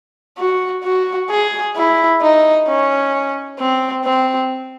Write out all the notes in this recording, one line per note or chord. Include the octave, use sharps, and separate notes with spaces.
F#4
F#4
G#4
E4
D#4
C#4
C4
C4